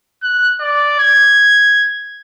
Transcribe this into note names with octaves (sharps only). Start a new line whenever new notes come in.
F#6
D5
G#6